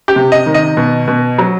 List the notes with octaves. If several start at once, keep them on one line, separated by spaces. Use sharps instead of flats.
G4
C3
D#5
D#3
D#5
B2
B2
F#3